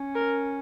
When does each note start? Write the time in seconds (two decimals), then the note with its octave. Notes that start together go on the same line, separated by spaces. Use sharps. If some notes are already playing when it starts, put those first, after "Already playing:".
Already playing: C#4
0.15 A#4